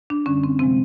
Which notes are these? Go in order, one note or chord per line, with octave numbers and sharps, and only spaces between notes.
D4
F#2 D3 G3 C#4
C4
C3 F3 G#3 C4